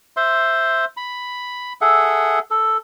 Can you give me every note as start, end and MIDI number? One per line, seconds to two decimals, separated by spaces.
0.17 0.85 72
0.17 0.85 76
0.17 0.85 84
0.97 1.73 83
1.81 2.39 68
1.81 2.39 69
1.81 2.39 76
1.81 2.39 78
2.51 2.77 69